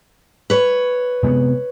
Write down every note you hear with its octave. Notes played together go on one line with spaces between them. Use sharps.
B4 C#5
C3 G#3 B3